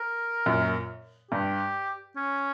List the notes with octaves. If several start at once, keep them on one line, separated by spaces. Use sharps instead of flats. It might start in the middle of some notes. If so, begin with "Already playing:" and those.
Already playing: A#4
F#2 A#2
G2 G4
C#4